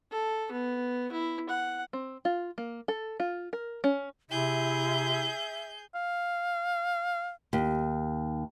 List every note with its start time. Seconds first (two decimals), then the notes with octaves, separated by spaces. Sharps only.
0.12 A4
0.51 B3
1.12 E4
1.49 F#5
1.93 C4
2.25 F4
2.58 A#3
2.88 A4
3.20 F4
3.53 A#4
3.84 C#4
4.31 C3 E4 G#4 E5 G6
5.95 F5
7.53 D#2